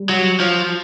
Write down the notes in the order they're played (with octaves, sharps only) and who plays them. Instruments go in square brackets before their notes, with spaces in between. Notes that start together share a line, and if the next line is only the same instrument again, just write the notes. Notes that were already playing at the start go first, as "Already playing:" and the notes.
Already playing: [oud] G3
[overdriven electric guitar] F#3
F3